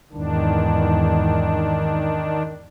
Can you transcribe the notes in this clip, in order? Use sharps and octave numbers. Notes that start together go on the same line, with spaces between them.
E2 G#2 D#3 D4